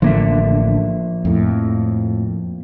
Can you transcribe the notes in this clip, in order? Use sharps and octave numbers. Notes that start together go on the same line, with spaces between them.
A1 D3 F3 A#3 E5
F2 A2